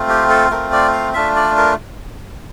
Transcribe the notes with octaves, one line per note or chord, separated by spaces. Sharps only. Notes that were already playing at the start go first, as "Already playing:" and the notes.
Already playing: A3 C4 F4
G4
A4
A3 C4 F4 A#4
D5
F5
A3 D4 F4 E5
D5
A#4